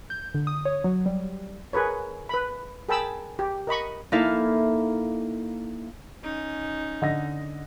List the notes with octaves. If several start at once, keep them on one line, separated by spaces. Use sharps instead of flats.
G6
D3
D#6
C#5
F#3
G3
G#4 A#4 B4 C#5
B4 B5
G#4 A#4 G5 A5 B5 E6
G4
A#4 D#5 B5 C#6
A#3 D#4 E4 A4 E5 F5
C#4 D#4
D3 D#5 A#6